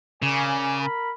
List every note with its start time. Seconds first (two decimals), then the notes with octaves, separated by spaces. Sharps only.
0.22 C#3 A#4 D5 G#5
0.80 A#4 B5